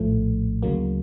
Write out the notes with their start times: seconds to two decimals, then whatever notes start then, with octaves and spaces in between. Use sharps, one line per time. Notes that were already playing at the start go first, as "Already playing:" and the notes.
Already playing: A#1 A2 F3 A3
0.63 D2 C#3 F#3 A#3